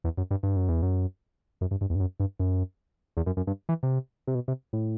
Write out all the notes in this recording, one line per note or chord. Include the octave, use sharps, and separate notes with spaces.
E2
F#2
G2
G2
F#2
E2
F#2
F#2
G2
G2
E2
G2
F#2
G2
F#2
E2
F#2
F#2
G2
E3
C3
C3
B2
C3
A2